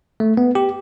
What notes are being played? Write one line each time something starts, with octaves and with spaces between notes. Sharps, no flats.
A3
B3
G4